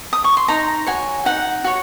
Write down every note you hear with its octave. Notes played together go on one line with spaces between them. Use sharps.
D#6
C#6
C6
D#4 A#5
F#4 C#5 G#5
D#4 F#5
F#4 C#5